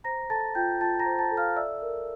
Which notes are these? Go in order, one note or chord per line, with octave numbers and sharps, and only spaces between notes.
C5 A#5 A#6
A4 A5 A6
F4 G5 G6
F4 A5 A6
A#5 A#6
C5
A5 A6
A4
F5 F6
D5 E5 E6
A#4